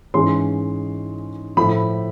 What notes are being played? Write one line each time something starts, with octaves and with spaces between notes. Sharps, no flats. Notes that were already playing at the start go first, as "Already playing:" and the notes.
G#2 E3 G#3 C#4 C6
A2 F3 A3 B5